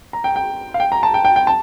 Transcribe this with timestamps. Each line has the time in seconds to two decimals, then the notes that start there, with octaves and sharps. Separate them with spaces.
0.13 A#5
0.24 G5
0.36 G5
0.74 F5
0.80 G5
0.92 A#5
1.03 A5
1.14 G5
1.25 G5
1.36 G5
1.47 A5